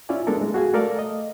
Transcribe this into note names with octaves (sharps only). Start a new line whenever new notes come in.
C#4 E4 F4 C#5 D5 G#5
G#3 B3 D4 E4 A4 A#4
G#3
F#4 G#4 F5 G#5
A3 A4 A#4 D5 F5
D#5